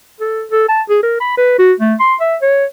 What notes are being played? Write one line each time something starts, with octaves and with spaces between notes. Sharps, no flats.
A4
A4
A5
G#4
A#4
B5
B4
F#4
A3
C6
E5
C#5